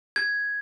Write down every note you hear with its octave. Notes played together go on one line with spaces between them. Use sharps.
G#6